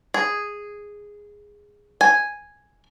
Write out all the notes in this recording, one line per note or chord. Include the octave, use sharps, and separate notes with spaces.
G#4
G#5